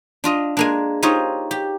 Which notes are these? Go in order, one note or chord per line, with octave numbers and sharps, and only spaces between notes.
D4 F4 D#5
G#3 A#3 D4
D#4 F4 G4 C5 C#5 D#5
G4